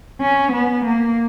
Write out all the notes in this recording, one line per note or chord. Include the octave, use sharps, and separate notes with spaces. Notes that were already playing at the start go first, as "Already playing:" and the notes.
C#4
B3
A#3